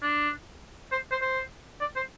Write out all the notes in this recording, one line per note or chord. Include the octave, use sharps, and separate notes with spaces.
D4
C5
C5
C5
D5
C5